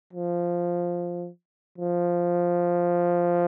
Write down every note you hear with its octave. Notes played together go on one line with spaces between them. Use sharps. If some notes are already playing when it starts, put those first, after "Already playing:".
F3
F3